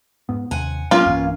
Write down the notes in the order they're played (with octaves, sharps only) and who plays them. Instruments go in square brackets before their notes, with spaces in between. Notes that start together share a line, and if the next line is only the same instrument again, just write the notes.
[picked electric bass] G#2 B3
[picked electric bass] D#2 C3 [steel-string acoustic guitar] F#5 G#5
[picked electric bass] F#3 [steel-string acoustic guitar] A#3 C#4 [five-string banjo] F4
[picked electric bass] B1 G2 E3